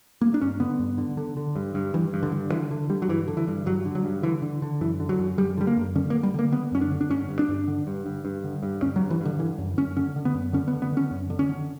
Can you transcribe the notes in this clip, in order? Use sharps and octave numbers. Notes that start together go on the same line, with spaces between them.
G2 A#3
D4
G2 C#4
D3 B3
G2
D3
D3
D3
G2
G2
G2 E3
G2
D3
G2
D3 E3
D3
D3 G3
F#3
G2 E3
D3
E3
G2
G2 F#3
D3
F#3
G2
D3 E3
D3
D3
F#2 E3
D3
F#3
F#2
F#2 G3
D3 G3
A#3
F#2
D3 C#4
A#3
D3
G3
D3 A#3
D3 B3
F#2 C#4
D4
D3
D4
G2 C#4
G2
D4
G2
D3
G2
G2
G2
D3
G2
G2 C#4
F#3
G2
E3
G2 D3
D3 E3
F#2
F#2 C#4
D3 C#4
D3
B3
F#2
D3 C#4
B3
D3
B3
D3 C#4
F#2
D3
C#4
D3